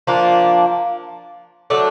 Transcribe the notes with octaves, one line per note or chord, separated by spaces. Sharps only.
F3 A#3 D4
F#3 A3 D4